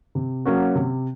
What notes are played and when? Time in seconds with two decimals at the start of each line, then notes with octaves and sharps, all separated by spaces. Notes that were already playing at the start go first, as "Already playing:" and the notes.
0.15 C3
0.46 F#3 A#3 C#4 F#4
0.75 C3